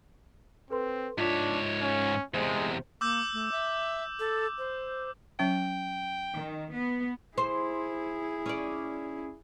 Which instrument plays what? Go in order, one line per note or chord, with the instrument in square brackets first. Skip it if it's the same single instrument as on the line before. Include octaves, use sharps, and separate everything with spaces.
[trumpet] C4 [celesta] A4 B4 C6
[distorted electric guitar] G#2 C#5 [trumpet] D4 [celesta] F4 B6 E7
[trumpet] C#4
[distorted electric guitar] E2 C3 [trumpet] G#3 [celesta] C5
[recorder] A#3 [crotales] D6 E6 G6
[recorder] A3
E5
A4
C5
[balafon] F#3 C#4 E5 [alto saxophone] G5
[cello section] D#3
B3
[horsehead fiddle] E4 G#4 [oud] C5
[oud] C#4 D5